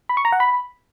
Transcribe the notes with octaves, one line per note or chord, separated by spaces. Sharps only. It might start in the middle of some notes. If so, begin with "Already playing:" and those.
B5
C#6
A#5
F#5
B5